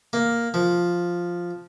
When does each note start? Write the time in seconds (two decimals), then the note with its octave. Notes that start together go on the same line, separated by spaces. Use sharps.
0.13 A#3
0.54 F3